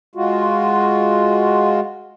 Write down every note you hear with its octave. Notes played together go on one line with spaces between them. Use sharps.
G#3 F4 F#4